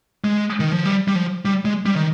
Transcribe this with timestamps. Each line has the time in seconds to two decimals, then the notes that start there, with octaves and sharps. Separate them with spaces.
0.24 G#3
0.60 D#3
0.73 F3
0.85 G3
1.08 G3
1.15 F3
1.45 G3
1.65 G#3
1.86 G3
1.96 D#3